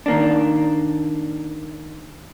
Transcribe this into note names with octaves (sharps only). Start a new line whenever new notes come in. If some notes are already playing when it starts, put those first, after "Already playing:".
D#3 A#3 D4